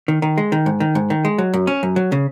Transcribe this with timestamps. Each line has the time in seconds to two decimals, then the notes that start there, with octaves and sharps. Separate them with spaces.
0.08 D#3
0.22 D#3
0.38 G#3
0.52 D#3
0.66 G#2
0.80 D#3
0.95 G#2
1.10 D#3
1.25 G#3
1.38 F#3
1.54 F#2
1.67 C#4
1.83 F#2
1.96 F#3
2.12 C#3